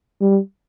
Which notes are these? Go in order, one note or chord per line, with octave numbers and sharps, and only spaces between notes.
G3